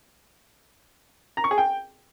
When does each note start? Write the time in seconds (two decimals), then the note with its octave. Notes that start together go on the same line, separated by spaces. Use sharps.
1.37 A#5
1.44 C#6
1.51 G#4
1.58 G5